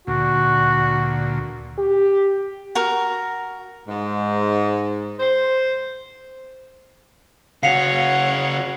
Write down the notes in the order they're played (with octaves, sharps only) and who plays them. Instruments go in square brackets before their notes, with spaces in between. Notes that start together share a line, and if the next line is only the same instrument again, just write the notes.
[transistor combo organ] D2 A#2 [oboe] F#4
[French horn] G4
[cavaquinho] F#4 A#4
[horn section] G#2
C5
[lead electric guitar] C#3 F#4 [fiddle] C#5 F#5 [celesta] F5 [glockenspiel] C7 C#7 F7